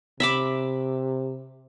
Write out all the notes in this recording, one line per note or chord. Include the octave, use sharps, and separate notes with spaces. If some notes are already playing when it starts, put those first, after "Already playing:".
C3 E5 B5 D6